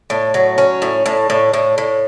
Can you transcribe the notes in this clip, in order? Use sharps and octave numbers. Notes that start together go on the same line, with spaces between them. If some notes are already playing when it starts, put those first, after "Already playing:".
A2
F#3
C#4
A2
A2
A2
A2
A2